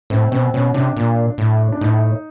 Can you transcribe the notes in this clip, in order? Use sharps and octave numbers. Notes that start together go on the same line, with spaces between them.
A2 C4
B2 C4
B2 C#4
C3 D4
A#2
A2
D4
A2 D#4